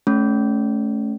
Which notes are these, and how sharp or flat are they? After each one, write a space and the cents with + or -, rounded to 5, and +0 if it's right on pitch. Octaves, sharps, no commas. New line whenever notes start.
A3 -20 C#4 +0